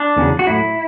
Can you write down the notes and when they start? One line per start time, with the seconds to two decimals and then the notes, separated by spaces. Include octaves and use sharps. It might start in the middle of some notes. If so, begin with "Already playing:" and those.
Already playing: D4
0.17 E2 C#3 F#3
0.39 F#4
0.47 A2 F#3 E4